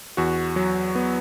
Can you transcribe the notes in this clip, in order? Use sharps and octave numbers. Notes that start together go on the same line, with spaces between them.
E2 F#4
F#3
B3